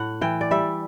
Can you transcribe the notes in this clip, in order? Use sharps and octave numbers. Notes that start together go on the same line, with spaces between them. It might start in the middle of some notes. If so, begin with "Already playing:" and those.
Already playing: A2 F#5
E3 G5
D5
G3 E5